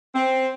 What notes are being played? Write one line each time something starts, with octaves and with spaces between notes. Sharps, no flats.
C4